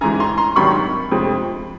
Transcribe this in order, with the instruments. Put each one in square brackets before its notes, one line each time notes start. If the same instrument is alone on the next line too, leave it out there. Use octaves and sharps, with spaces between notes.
[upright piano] A1 G#2 E3 G#5 A#5
A#5 C6
A#5 C6
G#1 G2 D#3 F#3 B5 C#6
F2 C3 F3 G#3